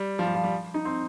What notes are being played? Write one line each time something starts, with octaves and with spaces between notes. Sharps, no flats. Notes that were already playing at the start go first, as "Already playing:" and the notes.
Already playing: G3
F3
G3
F3
G3
D#4
C4